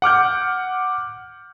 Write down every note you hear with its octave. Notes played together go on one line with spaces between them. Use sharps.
F#5 D6 F6 G6